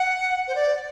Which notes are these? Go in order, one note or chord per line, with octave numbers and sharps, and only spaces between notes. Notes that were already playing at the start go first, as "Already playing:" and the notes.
Already playing: F#5
C5
D5